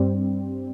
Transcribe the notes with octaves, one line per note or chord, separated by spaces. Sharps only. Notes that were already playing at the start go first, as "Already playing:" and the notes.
Already playing: G2 G3 C4